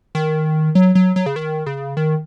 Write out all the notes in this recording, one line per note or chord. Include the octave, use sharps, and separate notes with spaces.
D#3
F#3
F#3
F#3
C#3
D#3
C#3
D#3